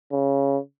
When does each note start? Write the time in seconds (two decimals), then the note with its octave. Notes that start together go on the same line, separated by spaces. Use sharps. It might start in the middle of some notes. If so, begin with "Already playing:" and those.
0.12 C#3